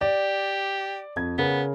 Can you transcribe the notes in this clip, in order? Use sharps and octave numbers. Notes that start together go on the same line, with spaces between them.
G4 D5
F2 G#6
C#3 B3 A#4